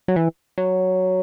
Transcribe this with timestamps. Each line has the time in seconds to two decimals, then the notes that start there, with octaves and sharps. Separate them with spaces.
0.08 F#3
0.16 E3
0.58 F#3